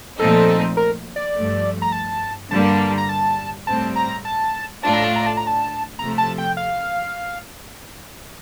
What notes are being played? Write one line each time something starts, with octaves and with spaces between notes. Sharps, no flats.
A#2 F3 A3 C4 D#4 A4
A#4
D5
G2 F3 A3
A#5
A5
G2 D3 G3 A#3 A5
A#5
A5
A2 G3 C4 A5
A#5
A5
A2 A3 D4 F4 A5
A#5
A5
A#5
A5
A#5
A5
C3 F3 A3 A#5
A5
G5
F5